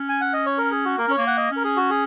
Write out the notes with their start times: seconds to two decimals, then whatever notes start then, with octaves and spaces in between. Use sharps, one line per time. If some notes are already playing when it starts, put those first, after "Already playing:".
Already playing: C#4
0.09 G#5
0.21 F#5
0.34 D#5
0.46 C#5
0.58 A#4
0.71 G#4
0.85 F#4
0.98 A#3 A#4
1.08 C#4 C#5
1.18 A#3
1.27 F#5
1.37 D#5
1.51 C#4
1.56 A#4
1.64 G#4
1.77 F#4
1.90 G#4